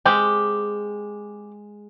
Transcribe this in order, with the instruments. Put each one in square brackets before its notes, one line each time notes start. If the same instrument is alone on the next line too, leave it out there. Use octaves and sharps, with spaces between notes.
[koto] G#3 [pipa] C4 G4